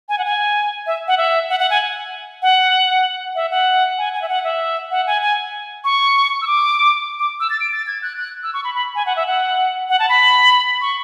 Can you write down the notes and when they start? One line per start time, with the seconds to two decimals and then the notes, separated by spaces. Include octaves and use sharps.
0.09 G#5
0.18 F#5
0.25 G#5
0.87 E5
1.08 F#5
1.18 E5
1.49 F#5
1.59 F#5
1.70 G#5
2.42 F#5
3.35 E5
3.51 F#5
3.98 G#5
4.14 G#5
4.22 E5
4.29 F#5
4.44 E5
4.91 F#5
5.07 G#5
5.22 G#5
5.84 C#6
6.42 E6
6.47 D6
7.19 D6
7.40 E6
7.50 A6
7.61 D7
7.72 A6
7.87 G#6
8.02 F#6
8.17 F#6
8.43 E6
8.54 C#6
8.64 B5
8.75 B5
8.95 G#5
9.06 F#5
9.16 E5
9.27 F#5
9.89 F#5
9.99 A5
10.09 B5
10.81 C#6